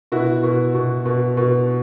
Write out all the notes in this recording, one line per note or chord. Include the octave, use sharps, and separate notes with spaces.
B2 E4 F#4
B2
B2
B2
B2